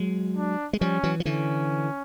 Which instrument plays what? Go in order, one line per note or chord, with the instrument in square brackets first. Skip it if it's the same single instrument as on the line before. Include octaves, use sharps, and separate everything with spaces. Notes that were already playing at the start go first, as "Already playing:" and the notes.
Already playing: [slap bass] F#3 G#3
[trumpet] D4
[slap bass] G#3
[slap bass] F3 G3 [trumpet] C#4
[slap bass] E3 F#3
F3
[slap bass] D3 E3 [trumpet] C#4